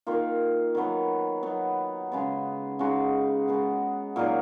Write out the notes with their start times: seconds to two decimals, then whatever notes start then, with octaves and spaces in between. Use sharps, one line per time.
0.07 D#3 A#3 F4
0.75 D#3 F#3 B3
1.43 F#3 B3 D#4 F#4
2.12 C#3 G#3 B3
2.79 C#3 G#3 D#4 F#4
3.48 G#3 B3 F#4
4.16 A#2 F#3 A#3 D#4